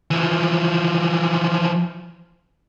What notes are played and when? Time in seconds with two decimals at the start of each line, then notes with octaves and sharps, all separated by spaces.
0.11 E3 F3